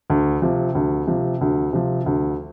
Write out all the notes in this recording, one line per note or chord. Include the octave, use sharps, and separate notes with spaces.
D2
C3 F3
D2
C3 F3
D2
C3 F3
D2